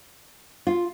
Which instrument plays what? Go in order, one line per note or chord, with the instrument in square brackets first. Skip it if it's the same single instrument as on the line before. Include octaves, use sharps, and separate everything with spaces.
[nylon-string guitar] F4